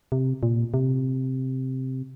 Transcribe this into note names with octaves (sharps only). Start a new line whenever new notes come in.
C3
A#2
C3